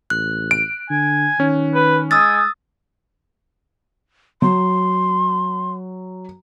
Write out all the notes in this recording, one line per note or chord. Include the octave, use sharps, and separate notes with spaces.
A1 F#6
D7
D3 G#5
D#3 C#4
B4
G#3 D#6 E6 A6
F#3 C6